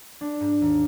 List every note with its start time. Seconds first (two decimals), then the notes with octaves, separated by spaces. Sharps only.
0.21 D4
0.40 G#2
0.61 D#2